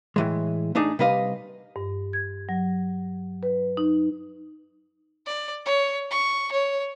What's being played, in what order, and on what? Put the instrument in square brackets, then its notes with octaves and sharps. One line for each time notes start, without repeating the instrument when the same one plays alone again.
[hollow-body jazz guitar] A2 E3 G#3
A3 D4 D#4 G#4
C3 G3 B4 D#5 F5
[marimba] G2
G#6
F#3
B4
D#4
[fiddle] D5
C#5
C#6
C#5